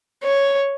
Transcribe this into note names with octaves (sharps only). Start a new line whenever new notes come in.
C#5